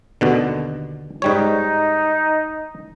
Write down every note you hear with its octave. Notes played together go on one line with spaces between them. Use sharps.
D#2 B2 D3
G#2 G3 D#4 C#5